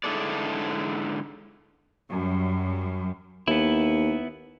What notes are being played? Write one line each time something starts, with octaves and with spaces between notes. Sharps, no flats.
G#2 D3 E4 G#4 A4 D5
F#2 G3
D#2 B3 E4